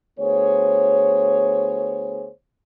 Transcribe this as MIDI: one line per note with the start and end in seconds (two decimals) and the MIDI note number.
0.19 2.29 38
0.19 2.29 59
0.19 2.29 68
0.19 2.29 72
0.19 2.29 73